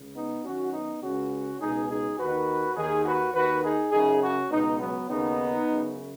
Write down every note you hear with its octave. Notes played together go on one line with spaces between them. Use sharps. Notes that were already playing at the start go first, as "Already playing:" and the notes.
Already playing: C#2 C#3
B3 D#4
F#2 D#3 C#4 F#4
B3 D#4
C#2 C#3 C#4 F#4
C#2 B2 D#4 G#4
D#4 G#4
D#2 D#3 F#4 B4
D#2 D#3 D#4 G#4
F#4 B4
D#2 D#3 F#4 B4
D#4 G#4
F#2 C#3 D#4 G#4
C#4 F#4
C#2 B2 B3 D#4
F#3 B3
D#2 C#3 B3 D#4
F#2 C#3